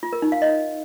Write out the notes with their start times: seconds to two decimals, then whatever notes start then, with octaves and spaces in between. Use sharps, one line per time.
0.03 F4
0.13 A#4
0.22 D#4
0.32 F5
0.42 D#5